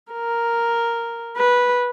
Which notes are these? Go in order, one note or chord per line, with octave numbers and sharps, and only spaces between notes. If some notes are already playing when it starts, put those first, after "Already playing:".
A#4
B4